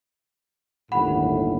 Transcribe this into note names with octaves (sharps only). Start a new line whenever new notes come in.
G1 D#2 A2 F#5 B5